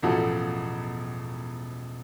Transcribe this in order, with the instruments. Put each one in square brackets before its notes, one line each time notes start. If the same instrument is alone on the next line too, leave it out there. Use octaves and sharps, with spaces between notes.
[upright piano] E1 A1 F3 F#4 A4